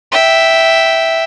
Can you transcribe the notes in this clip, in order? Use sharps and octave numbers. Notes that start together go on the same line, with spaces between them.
E5 G5